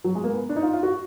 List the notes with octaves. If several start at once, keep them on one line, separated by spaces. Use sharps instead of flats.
F#3
G#3
A#3
B3
D4
D#4
F4
F4
F#4